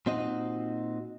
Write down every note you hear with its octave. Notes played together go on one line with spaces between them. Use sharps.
A#2 C4 D#4 F#4 D#5